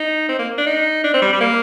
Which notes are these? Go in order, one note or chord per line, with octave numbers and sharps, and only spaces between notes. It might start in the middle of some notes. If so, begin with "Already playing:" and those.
Already playing: D#4
C4
A#3
D4
D#4
D4
C4
G3
G3
A#3